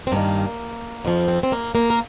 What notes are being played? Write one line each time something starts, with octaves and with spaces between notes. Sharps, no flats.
C4
G2 D#3 A#3
F2 F3 C4
C4
C4
A#3
A#3
A#4